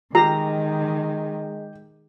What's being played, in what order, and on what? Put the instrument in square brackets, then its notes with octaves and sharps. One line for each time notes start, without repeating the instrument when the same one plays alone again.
[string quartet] D#3 [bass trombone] G#3 [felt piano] G4 [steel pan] A#5